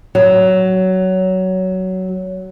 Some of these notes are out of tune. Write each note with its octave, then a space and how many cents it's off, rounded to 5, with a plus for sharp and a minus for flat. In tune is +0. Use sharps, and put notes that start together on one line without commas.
F#3 +15